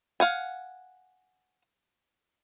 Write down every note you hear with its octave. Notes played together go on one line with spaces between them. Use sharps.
F5 F#5 G#5